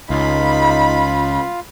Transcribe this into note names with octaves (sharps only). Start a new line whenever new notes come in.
C#2 D#4 F4 F5 B5